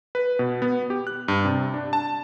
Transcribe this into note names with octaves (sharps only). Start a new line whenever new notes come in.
B4
B2
B3
G4
F#6
G2
C3
D4
A5